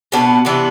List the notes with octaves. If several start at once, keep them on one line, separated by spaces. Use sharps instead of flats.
B2 B3 D4
C3 E3 B3 D4